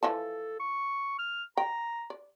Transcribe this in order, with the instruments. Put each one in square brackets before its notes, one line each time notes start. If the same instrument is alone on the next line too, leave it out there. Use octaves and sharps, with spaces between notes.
[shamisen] E3 F3 A5 [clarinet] A4
[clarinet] C#6
F6
[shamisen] G5 [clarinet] A#5
[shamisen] D5